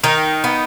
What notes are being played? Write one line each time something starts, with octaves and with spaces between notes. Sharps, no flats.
D#3 D#4
B3